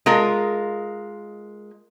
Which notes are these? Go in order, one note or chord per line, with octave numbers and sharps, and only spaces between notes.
G#3 F4 A#4